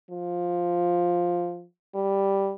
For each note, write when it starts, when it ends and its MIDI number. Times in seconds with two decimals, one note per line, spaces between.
0.11 1.65 53
1.95 2.53 55